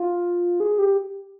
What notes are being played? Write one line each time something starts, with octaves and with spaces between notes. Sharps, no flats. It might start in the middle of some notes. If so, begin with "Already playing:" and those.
Already playing: F4
G#4
G4